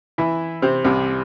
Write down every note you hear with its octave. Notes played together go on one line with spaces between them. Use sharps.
E3 E4
C3 C4
C2 C3